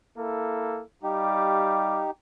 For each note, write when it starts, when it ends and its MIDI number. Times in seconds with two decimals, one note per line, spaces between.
0.17 0.83 58
0.17 0.83 64
0.17 0.83 69
1.03 2.05 55
1.03 2.11 63
1.03 2.11 67
1.03 2.05 77
1.03 2.05 86